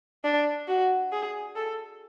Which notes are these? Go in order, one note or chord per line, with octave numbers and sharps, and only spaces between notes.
D4
F#4
G#4
A4